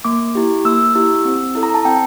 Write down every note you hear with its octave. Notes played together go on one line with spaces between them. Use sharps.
A#3 D6
E4 G4
A#3 E6
E4 G4
C4
E4 A4
A#5
A5
C4 G5